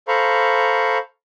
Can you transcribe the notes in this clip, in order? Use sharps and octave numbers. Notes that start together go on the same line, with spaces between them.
A4 C5 F5 A#5 B5 C#6